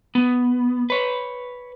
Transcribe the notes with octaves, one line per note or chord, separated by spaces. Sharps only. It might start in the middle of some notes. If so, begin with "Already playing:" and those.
B3
B4 C#5